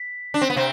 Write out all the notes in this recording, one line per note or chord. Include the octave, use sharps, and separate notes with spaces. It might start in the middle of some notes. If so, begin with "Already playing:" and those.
Already playing: B6
D4
C4
B3
C3 C4